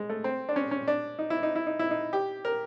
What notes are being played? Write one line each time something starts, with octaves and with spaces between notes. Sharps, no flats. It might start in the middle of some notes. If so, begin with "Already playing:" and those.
Already playing: G#3
A3
C4
D4
C#4
C#4
D4
D#4
E4
D#4
E4
D#4
E4
D#4
G4
A#4